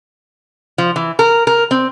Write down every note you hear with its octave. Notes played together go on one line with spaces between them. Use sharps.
F3
E3
A#4
A#4
C4